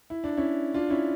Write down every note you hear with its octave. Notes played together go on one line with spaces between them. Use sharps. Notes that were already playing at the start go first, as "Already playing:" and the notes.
E4
D4
C#4 E4
D4 F4
C#4 E4